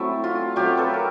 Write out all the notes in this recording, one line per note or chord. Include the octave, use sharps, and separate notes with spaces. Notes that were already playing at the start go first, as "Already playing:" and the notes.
Already playing: F#3 A3 C4 E4 A4
F4
F#3 A3 C4 F4 G4
A4 B4
A#4